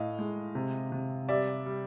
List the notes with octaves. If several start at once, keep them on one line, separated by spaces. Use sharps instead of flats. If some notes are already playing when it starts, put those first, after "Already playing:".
Already playing: A2 D#5 F5
G#3
C3
C3
G3 D5 E5
G3